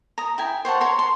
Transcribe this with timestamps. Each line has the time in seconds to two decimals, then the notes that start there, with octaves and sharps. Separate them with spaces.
0.18 A#5 D#6
0.38 E4 G5 G#5
0.65 C5 C#5 F#5 A5
0.81 C#5 A#5 C6
0.99 C6